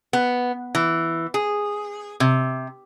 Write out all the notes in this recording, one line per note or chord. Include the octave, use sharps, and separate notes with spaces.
B3
E3
G#4
C3